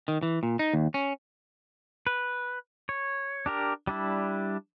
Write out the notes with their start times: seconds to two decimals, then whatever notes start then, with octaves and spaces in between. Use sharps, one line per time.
0.08 D#3
0.23 E3
0.43 A#2
0.59 D#4
0.74 D#2
0.94 C#4
2.07 B4
2.89 C#5
3.46 D4 G4 A#4
3.87 G3 D4 E4